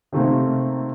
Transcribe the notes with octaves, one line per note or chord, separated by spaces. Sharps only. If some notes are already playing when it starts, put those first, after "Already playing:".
C3 D#3 A3 A#3 C4